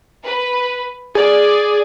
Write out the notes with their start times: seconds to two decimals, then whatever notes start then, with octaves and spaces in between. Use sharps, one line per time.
0.25 B4
1.15 G#4 D5